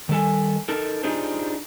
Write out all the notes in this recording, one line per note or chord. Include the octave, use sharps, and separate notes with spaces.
D#3 G3 A4 G#5
D#4 A4 A#4
D4 D#4 F4 G4 G#4 C5